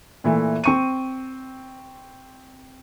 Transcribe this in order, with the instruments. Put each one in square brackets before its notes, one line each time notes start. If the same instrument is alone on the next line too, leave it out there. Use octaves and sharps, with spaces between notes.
[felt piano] A#2 E3 A3
C4 C#6 D#7